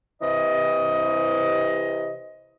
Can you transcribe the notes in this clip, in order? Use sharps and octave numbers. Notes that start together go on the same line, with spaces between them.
C3 E3 D#5